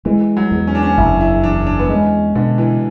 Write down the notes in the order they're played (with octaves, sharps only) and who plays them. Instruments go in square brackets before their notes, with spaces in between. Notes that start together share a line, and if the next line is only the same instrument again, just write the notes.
[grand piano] E3 [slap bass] G#3
[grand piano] F#3
[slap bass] E2
[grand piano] C#4
D4
C#4
[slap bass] F#1 [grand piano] E4
[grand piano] E4
[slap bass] E2 [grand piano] D4
[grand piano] D4
B3
[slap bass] G#3 [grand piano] C#4
[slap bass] B2 [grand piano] D3
[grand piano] E3